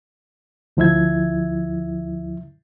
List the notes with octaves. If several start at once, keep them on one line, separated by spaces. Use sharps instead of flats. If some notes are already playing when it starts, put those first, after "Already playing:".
D2 F3 E4 E5 G#6